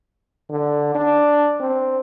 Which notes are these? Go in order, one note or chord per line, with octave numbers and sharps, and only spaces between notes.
D3
D4
C4